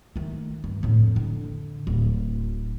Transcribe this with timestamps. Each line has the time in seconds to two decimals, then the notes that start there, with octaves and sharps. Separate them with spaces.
0.16 D#3 A3
0.64 G2
0.83 F2 A2
1.16 D3
1.87 D1